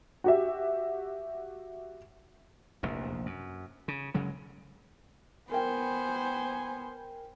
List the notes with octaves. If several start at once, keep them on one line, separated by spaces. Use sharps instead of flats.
F#4 G4 E5
F1 A#1 E2
F#2
C#3
F#1 C#3 F#3 G#3
B3 A#4 C5 G5 G#5